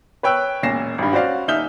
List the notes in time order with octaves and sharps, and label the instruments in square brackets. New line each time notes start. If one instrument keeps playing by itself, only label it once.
[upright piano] B4 C#5 G5 E6 F#6
E1 A#2 C#4 A#6 C7 E7
G#1 G2
C#4 F#4 C5 D5 F5
D#1 D#4 E5 F6 G6 G7